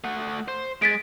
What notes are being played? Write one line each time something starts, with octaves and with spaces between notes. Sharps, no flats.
A3 F#5
C5
G#3 A6 B6 D7